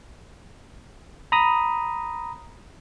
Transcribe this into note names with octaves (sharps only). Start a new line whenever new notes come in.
A#5 B5 D#6